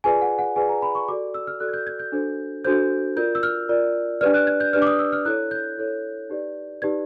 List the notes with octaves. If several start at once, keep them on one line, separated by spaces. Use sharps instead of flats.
F4 G#4 B4 D5 G#5
F#5
F#5
F4 G#4 B4 D5 G#5
A#5
B5
C#6
F#4 A4 D5 D6
E6
F6
F#4 A4 D5 F#6
G#6
G6
G#6
G6
D4 F#4 A4 C5
D4 F#4 A4 C5 G6
F4 A#4 D5 G6
E6
F6
F4 A#4 D5
D4 G4 B4 D5 F6
F#6
G#6
G6
D4 G4 B4 D5 F6
D6
D#6
E6
F6
E4 A4 C#5 F#6
G6
E4 A4 C#5
D#4 G4 B4 D5
D#4 G4 B4 D5 G#6